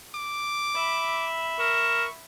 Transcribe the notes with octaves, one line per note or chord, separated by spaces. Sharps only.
D6
E5 B5
A#4 C#6 E7